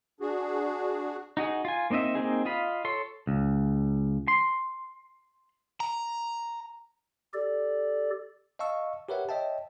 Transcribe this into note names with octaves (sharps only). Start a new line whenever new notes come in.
D4 F#4 G#4
D#4 F#4 G#4
F4 G#5
A#3 C4 D#4 D#5 E5
A#3 C4 D#4 G#4
F4 D#5 F5 B5
A4 C#5 C6
C#2
C6
A#5
G4 A4 D5
D#5 F5 A5 C#6 E6
G4 A#4 B4 C#5 E5 F#5
C#5 D#5 E5 G5 A5